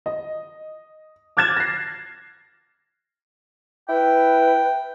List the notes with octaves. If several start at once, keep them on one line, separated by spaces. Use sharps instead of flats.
D#5
D6 F6 F#6 G#6 A6 E7
A#6 C7
E4 B4 G5